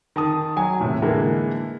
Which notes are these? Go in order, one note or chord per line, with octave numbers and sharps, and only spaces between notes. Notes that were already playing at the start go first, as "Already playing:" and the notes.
D#3 A5 D#6
F#3 G#5
D#2 A2 C3
D3 E3 G#3 A#3 A#4